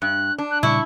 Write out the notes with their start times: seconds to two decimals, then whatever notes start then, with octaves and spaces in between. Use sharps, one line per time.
0.02 G2 F#6
0.38 D4
0.51 F#6
0.63 A#2 C#3 G3 E4 C#6